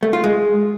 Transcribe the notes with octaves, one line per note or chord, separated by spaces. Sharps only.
A3
F4
G#3